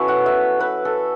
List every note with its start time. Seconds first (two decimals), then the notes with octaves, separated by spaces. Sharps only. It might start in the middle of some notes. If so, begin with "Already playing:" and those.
Already playing: F#3 C#4 E4 F#4 A4 B4
0.08 F#5
0.26 E5
0.60 B4
0.85 A4